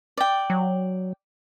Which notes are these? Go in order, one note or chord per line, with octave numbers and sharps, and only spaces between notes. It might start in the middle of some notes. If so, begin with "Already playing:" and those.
D5 G5
F#3